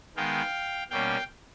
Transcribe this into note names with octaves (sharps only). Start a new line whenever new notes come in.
D#3 G#3 B3 F5 G5
B2 G3 A#3 C#4 F5 G5